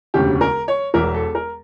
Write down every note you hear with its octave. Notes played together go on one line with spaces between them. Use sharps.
E1 D2 C#3 G4
A#4
C#5
E1 E2 E3 A#4
A4
A#4